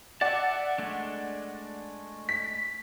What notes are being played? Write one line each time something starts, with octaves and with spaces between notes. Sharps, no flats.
D5 E5 F#5 A5
G#3 A3 D4
B6